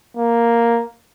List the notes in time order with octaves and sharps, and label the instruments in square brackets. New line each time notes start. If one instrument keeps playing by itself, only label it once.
[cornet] A#3